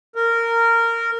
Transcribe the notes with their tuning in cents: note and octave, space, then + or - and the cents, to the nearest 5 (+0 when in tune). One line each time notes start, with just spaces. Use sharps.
A#4 -15